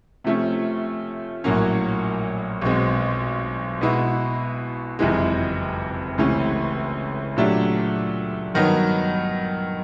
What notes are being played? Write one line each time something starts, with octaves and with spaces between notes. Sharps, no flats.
C3 F3 A3 C#4
A#1 A2 F#3 A#3 C#4
B1 B2 G#3 C4
B2 G#3 B3 E4
F#1 F2 C3 E3 G#3
C#2 C3 E3 A3 C#4
A#2 F#3 A3 D4 G4
G2 D#3 F#3 B3 D#4